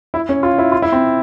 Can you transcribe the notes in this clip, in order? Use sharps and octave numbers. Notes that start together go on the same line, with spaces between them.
E4
C#4
F4
E4
F4
E4
C4